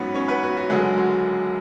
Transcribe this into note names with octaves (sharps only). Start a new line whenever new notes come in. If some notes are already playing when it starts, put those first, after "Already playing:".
Already playing: A1 G#2 F#3 B3 C#4 B4 C#5
C#4 C#5
B3 B4
F#4
F#4
F#1 F#2 D3 F#3 G#3 G#4
F#4